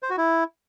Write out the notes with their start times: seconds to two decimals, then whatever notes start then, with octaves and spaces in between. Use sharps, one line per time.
0.03 C5
0.10 F#4
0.18 E4